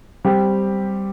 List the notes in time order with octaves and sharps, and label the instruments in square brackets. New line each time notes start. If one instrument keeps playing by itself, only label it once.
[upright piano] G3 C4 G4